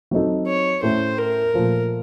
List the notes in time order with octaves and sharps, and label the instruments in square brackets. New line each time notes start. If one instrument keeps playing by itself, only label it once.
[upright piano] F#3 C4 D#4 A4
[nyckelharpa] C#5
[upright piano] A2 A3 C#4 A4 [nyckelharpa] C5
[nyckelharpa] A#4
[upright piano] A#2 F3 A3